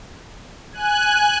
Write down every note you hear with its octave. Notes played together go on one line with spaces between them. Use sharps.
G#5 F#6